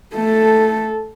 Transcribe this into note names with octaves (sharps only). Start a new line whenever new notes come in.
A3 A4